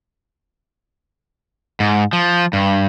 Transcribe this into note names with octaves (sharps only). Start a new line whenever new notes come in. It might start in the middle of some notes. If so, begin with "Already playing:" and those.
G#2
F3
G2